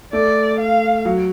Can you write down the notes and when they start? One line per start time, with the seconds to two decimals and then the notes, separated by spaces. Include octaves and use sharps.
0.13 A3 D5
0.59 F5
1.05 F#3